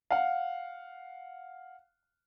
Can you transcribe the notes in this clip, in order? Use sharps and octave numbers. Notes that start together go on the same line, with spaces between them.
F5 F#5